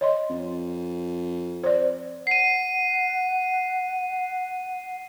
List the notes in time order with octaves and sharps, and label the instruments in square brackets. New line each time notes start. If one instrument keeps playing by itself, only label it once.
[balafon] C#5 D#5 C6
[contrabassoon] F2
[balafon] C5 D5
[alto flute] F#5 [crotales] C7 D#7